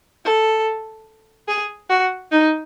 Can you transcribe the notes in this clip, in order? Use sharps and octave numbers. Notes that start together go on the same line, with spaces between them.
A4
G#4
F#4
D#4